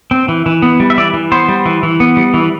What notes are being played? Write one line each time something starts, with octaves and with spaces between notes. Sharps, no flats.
C4
E3
E3
B3
G3
E5
E3 D5
E3
B3 C5
G3
E3
E3
B3
G3
E3